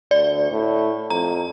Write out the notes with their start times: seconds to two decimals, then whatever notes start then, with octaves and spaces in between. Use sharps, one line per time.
0.11 D2 D5
0.50 A2
1.10 F2 A#5